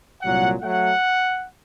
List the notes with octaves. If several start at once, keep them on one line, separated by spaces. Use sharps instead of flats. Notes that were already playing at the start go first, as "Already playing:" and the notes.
C2 A#2 F#3 F#5
F#3 A3 F#5